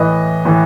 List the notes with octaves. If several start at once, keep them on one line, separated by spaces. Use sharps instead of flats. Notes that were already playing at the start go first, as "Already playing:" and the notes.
Already playing: A2 E3 B4 D#5
A2 E3